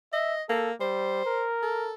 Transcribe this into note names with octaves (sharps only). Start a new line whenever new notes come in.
D#5 E5
A#3 A4
G3 C5
A#4
A4